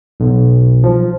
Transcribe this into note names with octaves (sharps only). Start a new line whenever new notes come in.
B1
F3